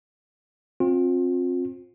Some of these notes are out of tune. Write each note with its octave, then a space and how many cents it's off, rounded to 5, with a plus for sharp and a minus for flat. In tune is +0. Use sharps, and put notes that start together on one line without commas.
C4 +25 F4 +35